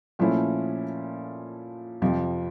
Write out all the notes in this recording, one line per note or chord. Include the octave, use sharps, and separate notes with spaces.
A#2 F3 A3 C#4 E4
F2 C3 F3